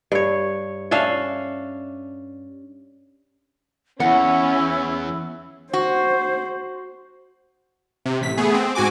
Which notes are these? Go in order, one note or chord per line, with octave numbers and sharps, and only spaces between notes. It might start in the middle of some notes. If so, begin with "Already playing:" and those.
G2 C#5
C#4 D4 E5 F5
E2 C#4 E4 F#5
F#4 C5
C3
A1 B6
A3 B3 G#4
C4
G#2 F#4 G#5 D6